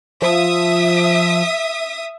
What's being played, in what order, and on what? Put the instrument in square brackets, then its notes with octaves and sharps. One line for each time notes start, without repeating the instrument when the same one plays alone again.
[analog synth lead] F3 [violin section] E5 D#6